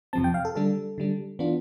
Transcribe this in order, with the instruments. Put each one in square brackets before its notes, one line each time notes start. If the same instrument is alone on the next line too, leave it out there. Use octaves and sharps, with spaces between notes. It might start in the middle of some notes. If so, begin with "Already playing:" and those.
[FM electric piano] F2 C3 F3 C4 A5
G5
F5
A4
D3 G3 D4 A4
D3 G3 D4
E3 B3 D4 F4